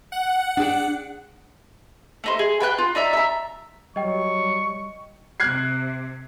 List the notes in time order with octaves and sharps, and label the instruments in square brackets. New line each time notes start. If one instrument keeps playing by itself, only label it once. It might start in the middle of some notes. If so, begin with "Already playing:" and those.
[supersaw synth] F#5
[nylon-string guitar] D4 G#4 G5
[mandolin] A3 D#4 C5
G#4
B4 G5 G#5 F#6
F4
D#4 D5 E5 A#5
E5 A#5
[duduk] F#3 [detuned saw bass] G3 [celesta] D#5 G5 [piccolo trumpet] C#6
[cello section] C3 [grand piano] F#6 G#6 C7